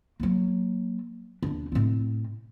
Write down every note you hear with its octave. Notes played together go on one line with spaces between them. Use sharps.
F#3 A#3
D#2 D4
A2 C4